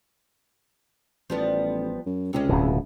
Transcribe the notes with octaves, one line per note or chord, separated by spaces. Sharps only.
A1 F3 G3 B3
F#2
C#2 C3 G#3 C#4
D1 B2